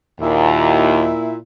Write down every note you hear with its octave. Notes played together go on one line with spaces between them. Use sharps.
D#2 A#2 E4